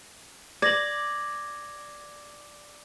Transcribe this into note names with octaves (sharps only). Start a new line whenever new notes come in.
D5 G#6 A#6 F#7